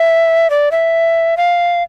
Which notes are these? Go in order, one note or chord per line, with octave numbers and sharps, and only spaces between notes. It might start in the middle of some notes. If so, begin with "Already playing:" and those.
Already playing: E5
D5
E5
F5